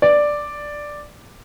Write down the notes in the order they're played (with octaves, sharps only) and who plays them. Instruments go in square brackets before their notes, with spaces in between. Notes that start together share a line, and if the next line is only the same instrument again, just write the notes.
[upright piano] D5